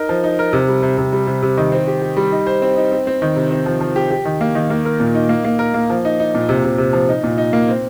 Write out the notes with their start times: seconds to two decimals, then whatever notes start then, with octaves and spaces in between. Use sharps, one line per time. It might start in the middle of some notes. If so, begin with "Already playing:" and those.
Already playing: D#4 A#4
0.09 F3
0.24 D#4
0.39 A#4
0.53 C3
0.68 G3
0.83 C3
0.98 C3
1.13 G3
1.27 C3
1.43 C3
1.58 D#3
1.72 C4
1.87 G4
2.02 G4
2.17 G3
2.32 D#4
2.47 C5
2.62 C4
2.76 D#4
2.92 C4
3.07 C4
3.22 D#3
3.36 C3
3.51 C4
3.66 F3
3.81 F3
3.96 G4
4.11 G4
4.25 D#3
4.41 A#3
4.55 D#3
4.70 A#3
4.85 A#4
5.00 A#2
5.15 D#4
5.29 A#3
5.45 A#3
5.59 A#4
5.74 A#3
5.90 F3
6.05 D#4
6.20 D#4
6.35 A#2
6.49 C3
6.64 C3
6.78 C3
6.93 F3
7.09 D#4
7.24 A#2
7.38 D#4
7.53 A#3
7.69 C4